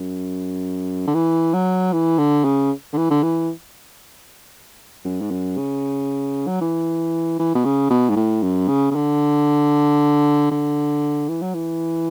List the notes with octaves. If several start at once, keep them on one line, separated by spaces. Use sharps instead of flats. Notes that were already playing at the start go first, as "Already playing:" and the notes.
Already playing: F#2
D3
E3
F#3
E3
D3
C#3
D3
E3
D3
E3
F#2
G#2
F#2
C#3
F#3
E3
E3
B2
C#3
B2
G#2
A2
F#2
C#3
C#3
D3
D3
E3
F#3
E3